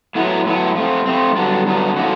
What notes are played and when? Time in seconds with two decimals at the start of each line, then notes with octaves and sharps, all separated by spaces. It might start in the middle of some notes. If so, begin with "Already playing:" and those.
0.15 A2 F#3 B3 E4
0.46 A2 F#3 B3 E4
0.75 F3 A3 C4
1.06 F3 A3 C4
1.36 G2 D3 F#3 B3 D4
1.66 G2 D3 F#3 B3 D4
1.96 D3 F3 A#3 C#4 F#4